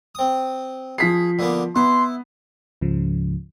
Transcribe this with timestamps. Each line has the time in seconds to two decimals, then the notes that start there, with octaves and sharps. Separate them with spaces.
0.15 C4 D#6
0.98 F3 G#4 B6 C7
1.39 D3 A#3 B3
1.76 B3 E4 C6
2.81 C#2 G#2 C#3 F3